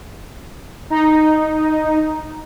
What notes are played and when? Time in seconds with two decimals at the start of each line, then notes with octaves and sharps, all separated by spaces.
0.90 D#4